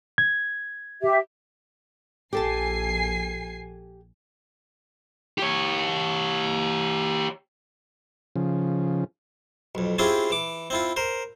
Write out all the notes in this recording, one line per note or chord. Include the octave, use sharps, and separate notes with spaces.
G#6
G4 E5
A#1 G4 A4 G#5 A5 C7
G4 C#5
C#3 F3
B1 F2
C4 C#4 E4 F4 G4 G#4
E3 D6
C4 E4 F4
A#4 C5